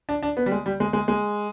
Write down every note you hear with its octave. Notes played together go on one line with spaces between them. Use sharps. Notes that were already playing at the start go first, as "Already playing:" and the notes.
D4
D4
B3
G3
G#3
G3
G#3
G#3
G#3